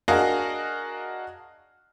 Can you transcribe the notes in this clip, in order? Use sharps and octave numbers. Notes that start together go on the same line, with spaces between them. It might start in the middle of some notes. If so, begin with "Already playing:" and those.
D4 F#4 G#4 A#4 D#5 F5